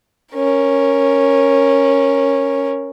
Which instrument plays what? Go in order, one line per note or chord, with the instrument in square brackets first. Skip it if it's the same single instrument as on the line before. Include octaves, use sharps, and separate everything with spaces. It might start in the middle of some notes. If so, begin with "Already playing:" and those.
[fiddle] C#4 A#4